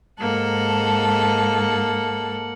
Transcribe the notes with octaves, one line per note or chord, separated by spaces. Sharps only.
G#2 A#3 A4 F#5